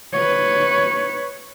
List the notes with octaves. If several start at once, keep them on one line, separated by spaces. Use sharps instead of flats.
B4 C#5